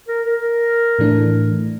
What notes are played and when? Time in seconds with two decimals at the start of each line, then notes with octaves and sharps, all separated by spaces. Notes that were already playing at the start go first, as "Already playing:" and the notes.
0.08 A#4
0.26 A#4
0.99 A2 E3 A3 D4